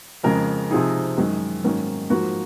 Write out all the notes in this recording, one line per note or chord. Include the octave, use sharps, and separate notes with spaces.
F2 C#3 G#3 A#4
C3 F3 C4 D#4 G#4
F#2 D#3 G#3
G#2 D#3 F#3 A#3 C#4
G#2 F3 A#3 F#4